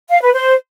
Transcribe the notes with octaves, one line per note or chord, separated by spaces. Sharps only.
F5
B4
C5